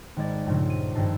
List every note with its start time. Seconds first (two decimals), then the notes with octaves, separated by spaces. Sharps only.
0.16 G#1 G#3 D5
0.46 C#2 G2 A#2 C#3 F3 A3
0.70 D#7
0.95 G#1 G2 G#3 A3 A5 C7